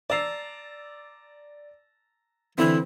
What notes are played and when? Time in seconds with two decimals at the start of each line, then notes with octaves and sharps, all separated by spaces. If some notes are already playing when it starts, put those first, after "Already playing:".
0.10 D5 A5 A#5 E6 C7
2.58 D3 E3 C4 E4 B4